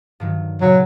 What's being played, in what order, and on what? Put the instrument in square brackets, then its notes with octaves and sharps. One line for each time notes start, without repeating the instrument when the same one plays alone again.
[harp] G2 D#3 F#3
[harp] A#2 C#3 [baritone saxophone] F#3